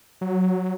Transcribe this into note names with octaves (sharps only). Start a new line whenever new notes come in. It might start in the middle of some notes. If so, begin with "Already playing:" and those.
F#3